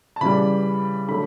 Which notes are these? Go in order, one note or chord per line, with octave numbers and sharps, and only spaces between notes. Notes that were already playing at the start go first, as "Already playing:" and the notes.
A5
C#3 E3 G3 B5
D3 F#3 A3 B5